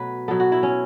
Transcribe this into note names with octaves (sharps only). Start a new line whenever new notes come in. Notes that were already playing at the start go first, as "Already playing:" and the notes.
Already playing: B2 F#3 A3 B4
B2 F#3 B3 A4
F#4
E4
C#4